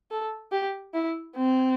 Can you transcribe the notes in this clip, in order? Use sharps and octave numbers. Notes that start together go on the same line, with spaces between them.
A4
G4
E4
C4